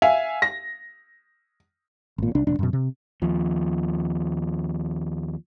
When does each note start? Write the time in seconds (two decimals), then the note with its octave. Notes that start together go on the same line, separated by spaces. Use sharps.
0.02 E5 F5 G#5
0.42 A#6
2.18 G#1 A#2
2.35 C2 D4
2.47 E1 D4
2.59 F#2 B2
2.73 C3
3.22 D#2 F3